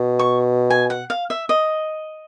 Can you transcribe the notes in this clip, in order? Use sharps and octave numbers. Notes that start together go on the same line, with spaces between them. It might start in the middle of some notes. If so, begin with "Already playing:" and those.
Already playing: B2
C#6
G#5
F#5
F5
E5
D#5